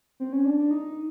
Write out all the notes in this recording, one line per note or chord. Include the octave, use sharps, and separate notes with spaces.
C4
C#4
D4
D4
D#4